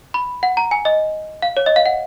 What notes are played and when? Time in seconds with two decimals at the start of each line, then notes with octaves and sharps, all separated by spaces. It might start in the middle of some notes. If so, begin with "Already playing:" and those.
0.14 B5
0.43 F#5
0.57 A#5
0.71 G#5
0.85 D#5
1.42 F5
1.57 C#5
1.66 D#5
1.76 F5
1.86 F#5